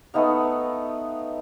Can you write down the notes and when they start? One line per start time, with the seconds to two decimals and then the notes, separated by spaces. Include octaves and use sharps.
0.14 A3 B3 D#4 F5